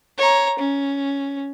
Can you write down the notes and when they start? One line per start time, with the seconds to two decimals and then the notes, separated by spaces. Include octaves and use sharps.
0.18 C#5 A#5
0.59 C#4